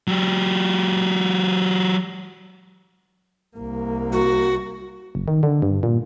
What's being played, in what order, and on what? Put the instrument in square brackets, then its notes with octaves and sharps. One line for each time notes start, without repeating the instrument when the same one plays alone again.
[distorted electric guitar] F#3 G4
[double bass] C2 A#3
[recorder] F#4
[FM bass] F#1
D#3
D3
G2
A#2